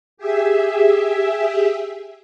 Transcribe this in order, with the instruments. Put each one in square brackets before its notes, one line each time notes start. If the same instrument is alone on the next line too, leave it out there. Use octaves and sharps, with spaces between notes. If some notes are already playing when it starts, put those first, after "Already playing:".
[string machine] G4 G#4 E5